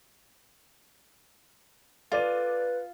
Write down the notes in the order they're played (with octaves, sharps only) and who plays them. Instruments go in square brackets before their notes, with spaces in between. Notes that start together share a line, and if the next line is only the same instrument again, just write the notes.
[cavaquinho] F4 [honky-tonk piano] A4 D5 D#7 [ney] B4